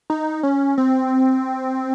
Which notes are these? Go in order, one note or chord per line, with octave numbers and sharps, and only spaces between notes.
D#4
C#4
C4